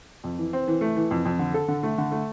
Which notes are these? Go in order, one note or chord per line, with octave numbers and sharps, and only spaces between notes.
F2
E3
C4
E3
A3
E3
F2
F2
D3
A4
D3
A3
D3
A3